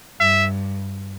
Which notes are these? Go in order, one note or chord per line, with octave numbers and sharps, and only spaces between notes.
G2 E5